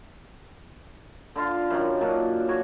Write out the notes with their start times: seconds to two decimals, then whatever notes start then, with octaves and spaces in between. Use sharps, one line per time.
1.36 D3 F4
1.70 F#2 D#3
2.01 A#2 F#3 D4
2.49 F#4 C#5